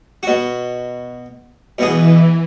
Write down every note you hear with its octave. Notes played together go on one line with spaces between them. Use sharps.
B2 F#4
B2 E3 B3 G#4